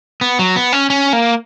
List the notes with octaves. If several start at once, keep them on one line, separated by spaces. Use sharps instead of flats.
B3
F#3
B3
C#4
C#4
A#3